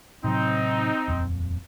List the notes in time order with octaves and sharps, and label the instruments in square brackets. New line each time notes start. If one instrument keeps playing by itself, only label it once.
[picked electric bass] A2 C3 F#3 [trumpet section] C4 D#4
[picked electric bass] D#1 F2